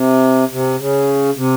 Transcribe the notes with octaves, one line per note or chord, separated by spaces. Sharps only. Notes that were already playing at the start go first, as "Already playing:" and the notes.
Already playing: C3
C3
C#3
C3